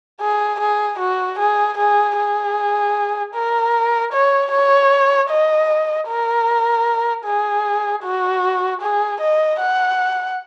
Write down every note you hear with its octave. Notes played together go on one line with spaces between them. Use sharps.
G#4
G#4
F#4
G#4
G#4
G#4
A#4
C#5
C#5
D#5
A#4
G#4
F#4
G#4
D#5
F#5